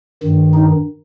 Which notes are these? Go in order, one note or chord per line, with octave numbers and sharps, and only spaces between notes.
G2 D#3
D#4